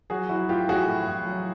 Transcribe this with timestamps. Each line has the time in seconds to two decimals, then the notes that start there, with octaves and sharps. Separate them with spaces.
0.10 F#3 F#4 G#4
0.29 F#3 E4 F#4
0.49 A2 F4 G4
0.68 A2 F#4 G#4
0.88 A2
1.07 A2
1.26 F#3